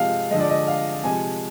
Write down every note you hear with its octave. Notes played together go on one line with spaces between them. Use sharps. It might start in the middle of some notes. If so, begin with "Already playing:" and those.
Already playing: C3 F3 G#3 F5
D3 F3 G#3 D#5
D5
D#5
F5
C3 F3 G#3 G#5